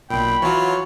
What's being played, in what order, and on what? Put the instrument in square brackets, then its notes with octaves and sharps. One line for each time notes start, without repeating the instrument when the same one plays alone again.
[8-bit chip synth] B1 A#2 [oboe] G5 [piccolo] B5
[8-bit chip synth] E3 F4 [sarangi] F#3 [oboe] C#5